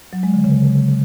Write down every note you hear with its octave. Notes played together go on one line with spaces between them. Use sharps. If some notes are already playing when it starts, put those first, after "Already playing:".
F#3
G#3
D3
C#3